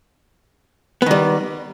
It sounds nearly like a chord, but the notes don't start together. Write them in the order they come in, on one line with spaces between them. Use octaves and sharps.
B3 D#3 G3